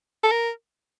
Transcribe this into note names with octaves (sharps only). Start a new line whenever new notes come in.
A4
A#4